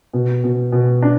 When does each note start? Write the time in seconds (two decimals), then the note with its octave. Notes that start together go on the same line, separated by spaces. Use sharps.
0.13 B2
0.44 B2
0.72 B2
1.02 D4